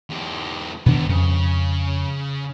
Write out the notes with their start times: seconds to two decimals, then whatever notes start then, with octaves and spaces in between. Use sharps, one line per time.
0.10 E2 G4
0.86 B2 D3 D#3 B3 D4
1.09 F2 C#3